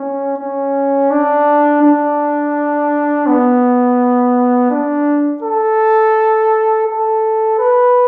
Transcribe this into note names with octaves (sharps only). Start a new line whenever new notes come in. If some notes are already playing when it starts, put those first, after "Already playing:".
Already playing: C#4
C#4
D4
D4
B3
D4
A4
A4
B4